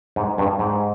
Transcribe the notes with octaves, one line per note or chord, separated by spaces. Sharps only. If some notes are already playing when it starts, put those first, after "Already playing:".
G#2
G2
G#2